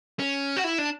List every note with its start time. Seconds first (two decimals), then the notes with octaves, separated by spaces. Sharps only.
0.19 C#4
0.57 F#4
0.64 E4
0.78 D4